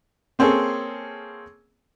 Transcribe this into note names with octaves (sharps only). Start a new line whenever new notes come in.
A#3 C4 C#4 G#4 A4